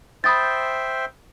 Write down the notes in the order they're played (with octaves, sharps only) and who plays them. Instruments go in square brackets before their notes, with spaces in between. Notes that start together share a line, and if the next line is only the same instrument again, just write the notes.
[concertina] C5 E5 G5 [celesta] B5 D#6 A6